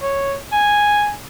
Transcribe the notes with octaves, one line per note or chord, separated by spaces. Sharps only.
C#5
G#5